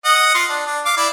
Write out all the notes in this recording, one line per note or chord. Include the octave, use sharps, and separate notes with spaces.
D#5 F#5
F4 C6
D4
D4
F5 D6
E4 D5